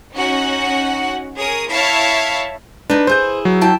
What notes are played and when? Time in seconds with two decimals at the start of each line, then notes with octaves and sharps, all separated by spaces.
0.14 C#4 D#4 F#4 F#5
1.38 G#4 A#4 C#5 D#6
1.71 E4 C#5 E5 F5 A5
2.90 D4 D#4 B4
3.07 E4 G#4 C5 G6
3.45 F#3
3.61 E4 G5 A5